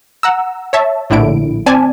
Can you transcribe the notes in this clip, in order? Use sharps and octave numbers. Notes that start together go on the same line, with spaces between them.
F#5 A#5 E6
C#5 E5 A5
A#1 A2 D3 E4 D7
C4 D5 G#5 A5